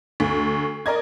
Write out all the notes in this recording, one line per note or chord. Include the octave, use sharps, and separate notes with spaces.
D2
A#4 D5 D#5 G#6